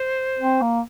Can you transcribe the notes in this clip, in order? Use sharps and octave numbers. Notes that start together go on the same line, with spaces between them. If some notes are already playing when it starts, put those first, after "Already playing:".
Already playing: C5
C4
A#3